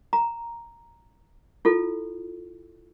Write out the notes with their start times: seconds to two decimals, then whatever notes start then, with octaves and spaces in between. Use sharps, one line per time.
0.13 A#5
1.65 E4 F4 A4